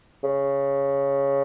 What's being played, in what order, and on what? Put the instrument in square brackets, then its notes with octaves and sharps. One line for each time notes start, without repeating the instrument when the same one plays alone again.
[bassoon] C#3